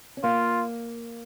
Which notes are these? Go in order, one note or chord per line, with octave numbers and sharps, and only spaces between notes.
C#4
A#3 F4